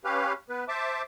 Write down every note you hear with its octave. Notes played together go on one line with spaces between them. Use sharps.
C#4 G4 B4 F5
B3 B4
C5 E5 A5 D6